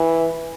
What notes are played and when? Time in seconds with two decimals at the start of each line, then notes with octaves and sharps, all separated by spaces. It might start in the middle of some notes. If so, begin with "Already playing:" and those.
Already playing: E3